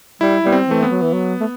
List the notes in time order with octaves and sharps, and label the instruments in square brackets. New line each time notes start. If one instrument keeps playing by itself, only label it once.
[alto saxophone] G3 [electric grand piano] E4
[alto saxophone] G3 [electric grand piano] B3
[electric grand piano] C4
[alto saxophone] E3 [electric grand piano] A3
[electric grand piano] B3
[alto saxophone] F#3
E3
F#3
A3